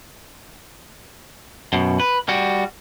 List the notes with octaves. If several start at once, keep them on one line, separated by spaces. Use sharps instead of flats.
F#2 B2
B4
G3 F#4